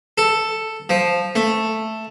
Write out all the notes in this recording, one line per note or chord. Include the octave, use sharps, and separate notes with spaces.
A4
F3
A3